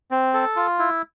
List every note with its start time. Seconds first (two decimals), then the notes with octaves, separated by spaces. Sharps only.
0.11 C4
0.33 A4
0.56 F4
0.79 E4